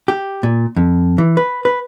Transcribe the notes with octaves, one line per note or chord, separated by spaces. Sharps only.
G4
A#2
F2
E3
B4
B4